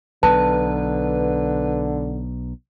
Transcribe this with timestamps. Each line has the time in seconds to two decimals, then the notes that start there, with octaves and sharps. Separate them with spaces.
0.23 B1 B2 D3 B4 A5